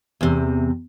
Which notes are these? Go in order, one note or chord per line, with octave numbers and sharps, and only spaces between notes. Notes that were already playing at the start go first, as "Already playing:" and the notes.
E2 C3